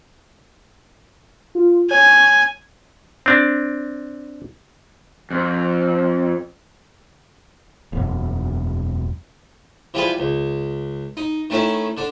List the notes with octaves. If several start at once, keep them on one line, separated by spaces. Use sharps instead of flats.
F4
C#5 G#5
C4 D4
F2
E1 F#2
E3 F3 G3 G#4 B4
C#2
D#4
D#3 A3 C#4 D#4 E4
D3 D4